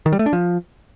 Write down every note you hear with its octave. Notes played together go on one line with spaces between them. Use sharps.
D#3
G3
A3
D4
F3